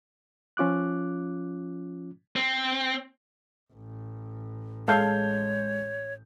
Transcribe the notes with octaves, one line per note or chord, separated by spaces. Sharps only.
F3 C#4 F4 D6 F#6
C4
A1
G#3 A4 C#5 F5 G6